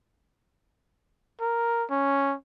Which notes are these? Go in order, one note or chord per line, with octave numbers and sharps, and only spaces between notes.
A#4
C#4